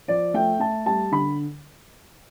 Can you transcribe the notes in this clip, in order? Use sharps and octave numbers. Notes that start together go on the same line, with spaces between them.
F3 D5
A3 G5
A3 A5
G3 A5
D3 B5